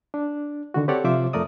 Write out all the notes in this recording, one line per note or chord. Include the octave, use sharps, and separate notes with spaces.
D4
D3 D#3 F#4
C4 G4 A4 C#5 D5 F#5
C3 F3 F4 C5 E5 D6
F2 A3 A#4 D5 D#6